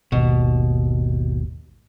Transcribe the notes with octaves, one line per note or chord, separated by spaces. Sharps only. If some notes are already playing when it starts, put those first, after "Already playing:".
G#1 D#2 B2